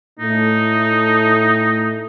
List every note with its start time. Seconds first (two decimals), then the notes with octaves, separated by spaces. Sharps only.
0.20 A2 A3 D#4